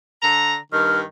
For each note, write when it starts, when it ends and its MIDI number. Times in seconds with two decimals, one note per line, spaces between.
0.22 0.56 50
0.22 0.56 82
0.72 1.02 43
0.72 1.02 51
0.72 0.97 89